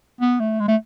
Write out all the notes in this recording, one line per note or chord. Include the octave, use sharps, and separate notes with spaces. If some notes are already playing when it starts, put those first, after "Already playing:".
B3
A3
G#3
A3